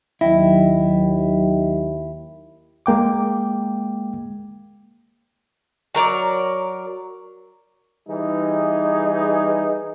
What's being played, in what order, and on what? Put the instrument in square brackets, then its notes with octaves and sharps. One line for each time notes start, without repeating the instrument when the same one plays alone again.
[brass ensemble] D#2 [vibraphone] F#3 D#5 G5 [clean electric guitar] E4
[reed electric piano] G#3 A#3 G5 D6
[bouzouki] F#3 A#4 C5 D5
[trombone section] E3 G3 D#4 G#4